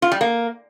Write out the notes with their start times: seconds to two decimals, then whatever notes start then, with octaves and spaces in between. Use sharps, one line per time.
0.02 F4
0.12 G3
0.21 A#3